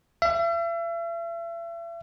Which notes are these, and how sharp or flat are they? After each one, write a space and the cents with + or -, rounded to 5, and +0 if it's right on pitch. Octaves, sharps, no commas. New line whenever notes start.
E5 +40